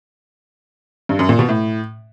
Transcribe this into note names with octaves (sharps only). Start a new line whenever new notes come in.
G2
F#2
A#2
B2
A2